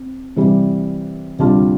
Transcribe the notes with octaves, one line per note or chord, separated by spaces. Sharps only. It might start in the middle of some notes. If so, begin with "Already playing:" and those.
Already playing: C4
C3 E3 G3
D2 C3 G3 D4 F4